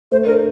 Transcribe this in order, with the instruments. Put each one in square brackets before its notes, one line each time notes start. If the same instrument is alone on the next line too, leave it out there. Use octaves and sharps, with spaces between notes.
[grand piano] A3 [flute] C5
[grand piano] D4 [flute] A#4